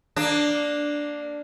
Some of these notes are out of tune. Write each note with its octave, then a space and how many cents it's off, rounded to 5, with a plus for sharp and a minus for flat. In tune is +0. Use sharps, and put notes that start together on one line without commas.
A#3 +0 D4 +0